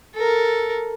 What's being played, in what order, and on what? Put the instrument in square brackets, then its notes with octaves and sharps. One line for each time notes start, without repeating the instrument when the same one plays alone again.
[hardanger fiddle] A4 A#4